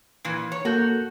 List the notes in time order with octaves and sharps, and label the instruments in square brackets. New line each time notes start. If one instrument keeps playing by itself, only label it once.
[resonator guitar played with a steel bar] A#2 E3
C#5
[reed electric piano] A#3 A4 G6 [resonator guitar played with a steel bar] F#4